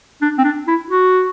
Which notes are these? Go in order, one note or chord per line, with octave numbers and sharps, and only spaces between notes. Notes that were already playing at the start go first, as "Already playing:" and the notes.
D4
C4
D4
E4
F#4